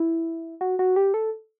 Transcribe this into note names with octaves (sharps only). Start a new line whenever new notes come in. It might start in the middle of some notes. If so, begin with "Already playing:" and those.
Already playing: E4
F#4
F#4
G4
A4